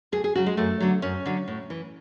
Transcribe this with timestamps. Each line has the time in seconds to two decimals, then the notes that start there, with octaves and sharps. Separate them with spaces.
0.12 D2 G#4
0.24 G#4
0.35 C#3 F#3 F#4
0.46 G#3
0.57 F#2 A3
0.80 D3 F#3
1.02 F#2 C#4
1.26 D3 F#3
1.48 A2
1.70 E3